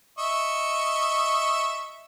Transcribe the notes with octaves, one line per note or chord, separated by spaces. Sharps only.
D#5 E5 C#6